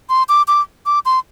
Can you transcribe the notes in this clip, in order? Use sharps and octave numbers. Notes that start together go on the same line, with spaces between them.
C6
D6
D6
D6
C6